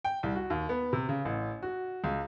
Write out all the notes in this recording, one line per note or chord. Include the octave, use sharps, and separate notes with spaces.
G5
C2
F#4
D#2
B3
C3
C#3
A1
F#4
C#2